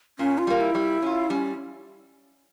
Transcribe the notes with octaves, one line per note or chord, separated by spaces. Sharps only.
A#2 C#4
F4
G3 A#3
F4
E4
G3
C#4 F4
G3 C#4